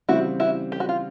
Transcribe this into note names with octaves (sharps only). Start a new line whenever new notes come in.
C#3 E3 G3 C4 E4 F#4
E4 F#4
G4
F#4
F4